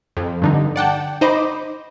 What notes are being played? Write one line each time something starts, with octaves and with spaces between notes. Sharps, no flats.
F2
G2 D3 D#4
D5 F#5 G5 A5
D#4 C5 D#5 B5 D6